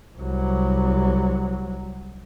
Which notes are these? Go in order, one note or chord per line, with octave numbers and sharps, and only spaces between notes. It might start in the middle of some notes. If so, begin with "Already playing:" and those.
C2 F#3